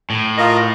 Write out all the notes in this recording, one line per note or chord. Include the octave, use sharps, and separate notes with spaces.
A2
F4 A#4 D#5